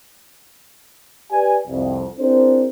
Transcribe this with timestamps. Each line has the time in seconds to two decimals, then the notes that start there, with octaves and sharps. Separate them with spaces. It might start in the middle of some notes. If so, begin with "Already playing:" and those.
1.31 G4 B4 D5 G#5
1.67 C2 F2
2.18 C4 D4 E4 G#4 A#4 C5